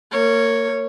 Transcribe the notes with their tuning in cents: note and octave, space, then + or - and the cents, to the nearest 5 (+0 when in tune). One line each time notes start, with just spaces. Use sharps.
A#3 -25 C#5 +0